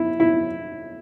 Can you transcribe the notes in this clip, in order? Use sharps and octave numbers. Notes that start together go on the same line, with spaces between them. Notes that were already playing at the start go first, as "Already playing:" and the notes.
Already playing: E4
E4